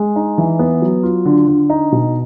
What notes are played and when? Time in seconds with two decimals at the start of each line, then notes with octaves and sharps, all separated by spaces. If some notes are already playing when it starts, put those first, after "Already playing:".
Already playing: G#3
0.16 D#4
0.38 E3
0.59 B3
0.82 F#3
1.03 F4
1.25 D3
1.47 D3
1.70 D#4
1.92 B2